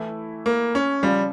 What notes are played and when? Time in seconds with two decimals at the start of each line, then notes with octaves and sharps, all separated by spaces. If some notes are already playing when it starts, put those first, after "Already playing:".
Already playing: E3 A3 E4
0.46 A#3
0.75 C#4
1.03 C#3 F3 G3 C#4 F4